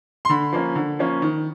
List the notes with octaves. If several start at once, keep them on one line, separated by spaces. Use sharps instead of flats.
C6
D3 B5
F3 A#3 C#4
D3
F3 A#3 C#4
D#3